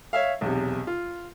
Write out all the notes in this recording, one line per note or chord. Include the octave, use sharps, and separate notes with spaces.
C#5 E5 F5
B1 E2 C3
F4